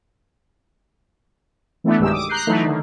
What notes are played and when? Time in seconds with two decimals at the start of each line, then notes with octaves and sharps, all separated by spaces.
1.84 E3 A3 B3 D4 E4
1.99 B1 G2 D#3 G#3 G4 E6
2.11 D6 D#6
2.29 A#5 F#6 G6 C7
2.47 E3 F#3 A3 D#4 E4
2.63 D3 D#3